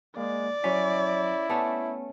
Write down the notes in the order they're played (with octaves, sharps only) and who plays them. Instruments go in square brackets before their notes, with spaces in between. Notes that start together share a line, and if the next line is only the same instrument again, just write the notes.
[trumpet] G#3 [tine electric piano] A#3 [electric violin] D5
[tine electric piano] F#3 B6 [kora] C#4 [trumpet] E4
[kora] A3 C#4 [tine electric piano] B3